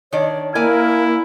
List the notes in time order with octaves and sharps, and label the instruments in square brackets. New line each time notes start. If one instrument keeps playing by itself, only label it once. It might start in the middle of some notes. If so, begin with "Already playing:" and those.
[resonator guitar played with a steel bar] D#3 D4 D5 [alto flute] C#5
[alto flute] A#3 [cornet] E4 [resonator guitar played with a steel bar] A#4 D5 G#5